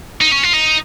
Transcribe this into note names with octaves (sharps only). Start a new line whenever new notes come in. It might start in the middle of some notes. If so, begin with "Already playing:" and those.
D#4
C#4
F4
D#4